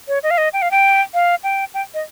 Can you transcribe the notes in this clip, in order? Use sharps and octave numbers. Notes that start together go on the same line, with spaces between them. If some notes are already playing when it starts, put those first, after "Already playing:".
C#5
D#5
F5
D#5
G5
F5
G5
F5
G5
G5
D#5